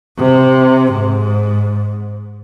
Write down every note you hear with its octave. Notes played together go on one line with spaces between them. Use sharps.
C3
G#2